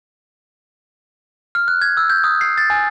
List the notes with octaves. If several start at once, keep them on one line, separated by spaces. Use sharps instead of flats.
F6
F#6
G#6
E6
G6
D#6
C7
A6
G#5